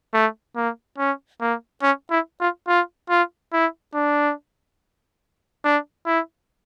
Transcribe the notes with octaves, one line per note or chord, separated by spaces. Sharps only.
A3
A#3
C#4
A#3
C#4
E4
F4
F4
F4
E4
D4
D4
E4